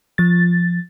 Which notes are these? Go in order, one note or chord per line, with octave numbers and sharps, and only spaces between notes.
F3 A6